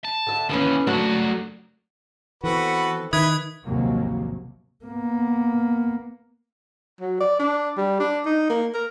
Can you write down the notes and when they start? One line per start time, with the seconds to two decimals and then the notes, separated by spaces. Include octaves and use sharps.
0.04 A5
0.27 D3 E5
0.49 D#2 D3 E3 B3 C#4
0.87 F#3 A3 A#3 D4 F#4
2.44 E3 B3 C4 F#4 A4 B4
3.13 D#3 E4 B4 D#6 G#6
3.64 A#1 D#2 G#2 C3 F#3 A#3
4.85 A#3 B3
7.01 F#3
7.20 D5
7.40 D4
7.77 G3
8.00 D4
8.25 D#4
8.50 A#3
8.74 A#4